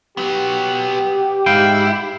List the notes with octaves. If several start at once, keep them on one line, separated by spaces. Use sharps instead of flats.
F#3 B3 G4
G#2 E4 F5 G5